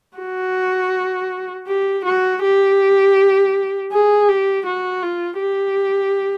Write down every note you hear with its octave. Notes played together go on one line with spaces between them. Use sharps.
F#4
G4
F#4
G4
G#4
G4
F#4
F4
G4